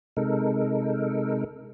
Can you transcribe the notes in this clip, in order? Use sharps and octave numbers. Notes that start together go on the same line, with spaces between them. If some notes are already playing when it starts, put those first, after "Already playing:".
C3 G#3 D#4 A4 A#4